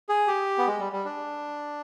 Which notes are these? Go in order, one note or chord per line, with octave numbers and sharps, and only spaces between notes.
G#4
G4
B3
G#3
G3
G3
D4